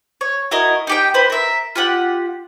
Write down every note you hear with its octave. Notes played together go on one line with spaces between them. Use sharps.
C#5
E4 F#4 A#4 D#5
D#4 G4 G5
B4 C5
A#4 E5
F4 G4 F#5